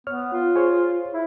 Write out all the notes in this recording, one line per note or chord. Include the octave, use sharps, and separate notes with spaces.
B3 C#5 F6
F4
G#4 C5 C#5
E4